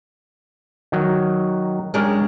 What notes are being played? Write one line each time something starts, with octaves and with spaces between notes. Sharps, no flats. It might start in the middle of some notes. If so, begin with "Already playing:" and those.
D#3 F#3
G#3 C#4 D4 G4 A#4